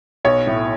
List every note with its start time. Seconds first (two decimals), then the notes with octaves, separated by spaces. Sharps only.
0.25 B1 C#5
0.47 A2